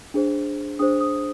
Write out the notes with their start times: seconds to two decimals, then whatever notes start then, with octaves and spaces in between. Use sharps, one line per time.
0.14 D4 G#4 C5
0.79 D4 G#4 C5 D#6
1.01 D#6